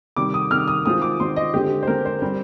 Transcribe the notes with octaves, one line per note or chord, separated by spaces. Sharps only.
C3 D#3 G3 D6
D#6
C3 D#3 G3 F6
D#6
D#3 G#3 C4 F4 D#6
D6
D#3 G#3 C4 F4 C6
D#5
D3 G#3 C4 G4
C5
D3 G#3 C4 A#4
C5
G3 C4